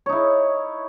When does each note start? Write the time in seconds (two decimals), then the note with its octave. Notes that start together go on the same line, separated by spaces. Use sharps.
0.06 C#5
0.09 D#4
0.12 E4